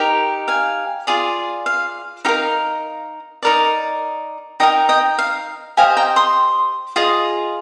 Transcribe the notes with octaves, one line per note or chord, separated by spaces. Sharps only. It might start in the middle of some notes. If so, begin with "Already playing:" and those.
Already playing: D#4 G4 A#4
F5 G#5
F4 G#4 D5
F5
D#4 G4 A#4 F5
D#4 A#4 D5
D#4 G4 A#4 D#5 G5
D#5 G5
F5
G4 C5 D#5 F5 G#5
G5 A#5
C6 D#6
F4 G#4 D#5